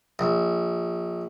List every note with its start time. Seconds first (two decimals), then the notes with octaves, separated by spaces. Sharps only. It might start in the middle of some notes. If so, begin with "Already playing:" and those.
0.19 A#1